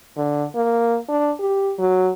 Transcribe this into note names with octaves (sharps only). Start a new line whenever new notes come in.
D3
A#3
D4
G4
F#3